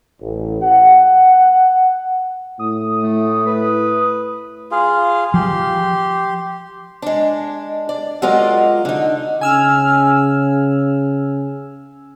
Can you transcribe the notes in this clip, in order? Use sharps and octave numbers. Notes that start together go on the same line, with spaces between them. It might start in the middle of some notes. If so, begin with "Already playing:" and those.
A1
F#5
A2 D#6
A3
B4
F4 G#4 F5
F3 G4 C6
G#3 D4
D5
F#3 G#3 F4 A#4 D5 D#5
D3 D#4
C#3 G#5 E6 F6